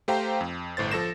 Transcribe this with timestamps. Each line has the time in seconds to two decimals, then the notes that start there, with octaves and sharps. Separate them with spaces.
0.08 A3 G4 C5 F5 G5 A#5
0.41 F2
0.77 G1 A2 C5 A6
0.91 F3 A4 A#6 E7